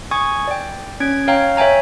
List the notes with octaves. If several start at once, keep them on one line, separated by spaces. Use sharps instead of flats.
G#5 C#6 D#6 G#6
D5 G5
C#4 G#6 D7
C#5 F5 G5 A#5
C#5 E5 G5 G#5 A#5